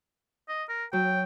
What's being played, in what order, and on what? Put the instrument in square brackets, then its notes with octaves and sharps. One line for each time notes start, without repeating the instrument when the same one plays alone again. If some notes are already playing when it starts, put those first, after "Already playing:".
[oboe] D#5
A#4
[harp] F#3 [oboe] G5